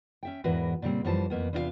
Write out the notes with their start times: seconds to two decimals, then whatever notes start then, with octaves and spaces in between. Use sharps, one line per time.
0.23 C#4 E5 G5
0.44 E2 G#2 E3 F#4 A#4 B4
0.82 A#2 C#3 G3 C4
1.04 F#2 E3 F3 G3 C5 A5
1.30 F2 A#3 B3
1.53 E2 C3 D4 F4 G#4 F5